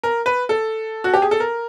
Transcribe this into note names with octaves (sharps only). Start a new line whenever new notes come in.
A#4
B4
A4
F#4
G4
G#4
A4
A#4